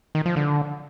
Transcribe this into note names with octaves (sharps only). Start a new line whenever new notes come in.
D#3
F3
D3